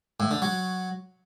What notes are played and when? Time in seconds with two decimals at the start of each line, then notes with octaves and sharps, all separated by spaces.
0.20 A2
0.31 D3
0.42 F#3